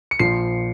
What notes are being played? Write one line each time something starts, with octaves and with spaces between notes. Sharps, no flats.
C#7
A#1 A#2 F3 C7